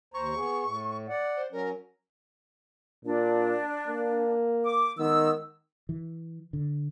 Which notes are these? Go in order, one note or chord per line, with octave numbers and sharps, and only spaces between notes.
D#2 C5 A#5 C#6
B3 G#4
A2
D5 F#5
C5
F#3 C#4 A#4
A#2 D4
A#3
D6
D#3 G#3 B3 E6
E3
D3